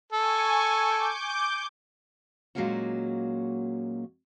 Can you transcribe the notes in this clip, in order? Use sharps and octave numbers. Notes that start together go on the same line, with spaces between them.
A4 G#5 C#6
D6 G6
A#2 F#3 G#3 A#3 C#4 F#4